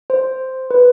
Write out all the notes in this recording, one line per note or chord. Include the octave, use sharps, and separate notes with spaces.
C5
B4